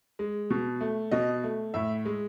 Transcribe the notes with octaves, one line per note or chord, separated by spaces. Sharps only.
G#3
B2
A3
B2 D#5
A3
A2 E5
G#3